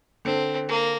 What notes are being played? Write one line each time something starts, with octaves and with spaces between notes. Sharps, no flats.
D3 C4
A#3